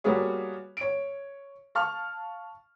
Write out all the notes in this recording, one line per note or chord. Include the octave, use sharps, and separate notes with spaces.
G3 A#3 B3 F#4 G#4 C#5
C#5 D7
F5 A5 C#6 F6